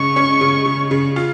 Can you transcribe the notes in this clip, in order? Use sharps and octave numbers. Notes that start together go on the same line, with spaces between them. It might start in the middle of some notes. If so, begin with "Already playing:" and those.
Already playing: C#3 G#3 C#6
C#4
C#3
C#3
C#3
F4